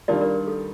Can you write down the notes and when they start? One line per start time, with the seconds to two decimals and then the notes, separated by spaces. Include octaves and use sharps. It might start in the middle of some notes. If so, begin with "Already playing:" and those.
0.08 D#3 G3 D4 F4 A#4 D5
0.21 A#4 D5
0.34 A#4
0.48 A4